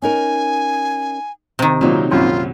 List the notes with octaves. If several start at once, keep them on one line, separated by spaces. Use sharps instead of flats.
C#4 D#4 A#4 G#5
C3 D#3
A#2 F#3 A#3 C4 D#4 C#5
A#1 F#2 C#4 F4